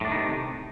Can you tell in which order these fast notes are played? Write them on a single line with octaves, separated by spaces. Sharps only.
A2 D4 D#3 D#4 C3